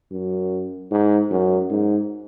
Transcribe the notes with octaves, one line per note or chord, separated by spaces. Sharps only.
F#2
G#2
F#2
G#2